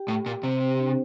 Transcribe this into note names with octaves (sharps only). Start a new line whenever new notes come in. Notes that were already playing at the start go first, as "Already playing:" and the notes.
Already playing: G4 G5
A2
A#2
C3 C4 C5
C4 C5
D4